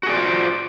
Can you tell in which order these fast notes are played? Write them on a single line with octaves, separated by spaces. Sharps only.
F#4 G#4 D5 F4 C5